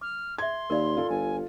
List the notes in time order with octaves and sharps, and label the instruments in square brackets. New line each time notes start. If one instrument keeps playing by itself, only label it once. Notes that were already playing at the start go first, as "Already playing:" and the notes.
[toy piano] D6 [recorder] F6
[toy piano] G#4 E5 [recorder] C6 [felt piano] G#6
[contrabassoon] D#2 [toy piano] A#4 D5 F5
[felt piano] F4 A4
[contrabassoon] G1 [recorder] G#5